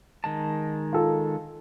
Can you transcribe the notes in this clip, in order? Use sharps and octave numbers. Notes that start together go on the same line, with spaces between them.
D#3 G#3 A5
F4 A4